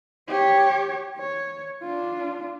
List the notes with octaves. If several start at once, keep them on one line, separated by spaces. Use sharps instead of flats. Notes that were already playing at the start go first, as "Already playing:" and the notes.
G4 C#5
C#5
D4 F4